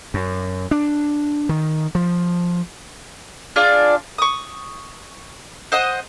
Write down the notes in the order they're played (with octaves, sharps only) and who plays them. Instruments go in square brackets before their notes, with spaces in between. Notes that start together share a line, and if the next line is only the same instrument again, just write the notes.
[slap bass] F#2
D4
D#3
F3
[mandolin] D4 F4 G#4 D5
C#6 D#6
C5 D#5 F#5 D#6